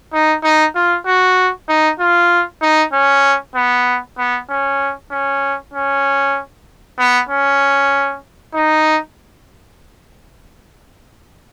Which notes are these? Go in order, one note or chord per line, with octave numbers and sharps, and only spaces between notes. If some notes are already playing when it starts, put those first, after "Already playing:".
D#4
D#4
F4
F#4
D#4
F4
D#4
C#4
B3
B3
C#4
C#4
C#4
B3
C#4
D#4